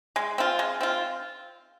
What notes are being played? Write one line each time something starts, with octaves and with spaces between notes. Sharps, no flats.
G#3
C4 F4
G#3
C4 F4